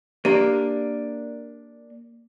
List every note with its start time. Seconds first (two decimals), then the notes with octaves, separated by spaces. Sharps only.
0.25 A#3 D4 G4 A#4